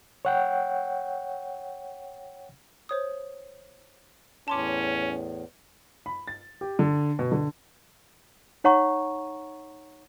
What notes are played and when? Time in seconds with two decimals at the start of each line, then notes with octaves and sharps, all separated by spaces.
0.25 C#5 F#5 G5
2.89 C5 C#5 D#6
4.48 E2 A2 C#4 A5 C6 D6
6.06 B5
6.28 A6
6.61 G4
6.79 D3
7.19 B2
7.32 D3
8.64 D#4 C#5 F#5 A#5 C#6